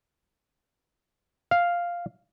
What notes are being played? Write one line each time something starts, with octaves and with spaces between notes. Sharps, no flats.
F5